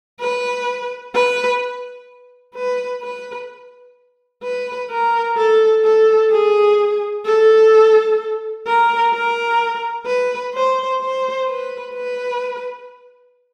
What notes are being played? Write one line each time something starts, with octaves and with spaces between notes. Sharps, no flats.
B4
B4
B4
B4
B4
A#4
A4
A4
G#4
A4
A#4
A#4
B4
C5
C5
B4
B4